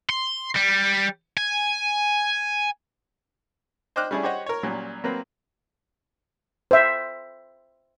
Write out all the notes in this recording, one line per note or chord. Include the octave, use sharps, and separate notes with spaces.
C6
G3
G#5
C5 D#5 G5 D6 F6 F#6
G3 A3 C#4 D4 E4 G#4
G4 C5 C#5 D#5 F#5
A#4 C#5
A#2 F#3 G3 C#4
F#3 A#3 C4 B4
C5 E5